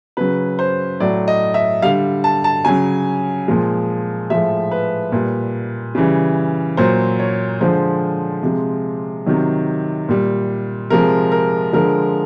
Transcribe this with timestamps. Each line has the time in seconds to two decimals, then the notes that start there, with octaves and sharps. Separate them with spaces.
0.17 C#3 F#3 B4
0.59 C5
1.00 A2 F#3 D5
1.28 D#5
1.54 E5
1.82 G3 F5
1.85 D3
2.24 A5
2.44 A5
2.65 C#3 F#3 G#5
3.48 A#2 F3 G#3
4.30 A2 F3 G#3 E5
4.71 B4
5.12 A#2 G3
5.95 C#3 E3 G3
6.77 A#2 F#3 C5
7.19 C#5
7.61 D3 F3 G#3 C5
8.43 C3 F3 G#3
9.26 C3 D#3 F#3
10.09 A#2 G3
10.90 C3 F3 G#3 A#4
11.32 A#4
11.73 D3 F3 G#3 A#4